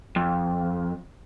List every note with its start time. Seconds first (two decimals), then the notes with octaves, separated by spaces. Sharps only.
0.16 F2